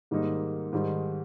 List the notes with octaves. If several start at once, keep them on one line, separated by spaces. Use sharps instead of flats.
G#2 D#3 G3 A#3 D#4
G#2 D#3 G3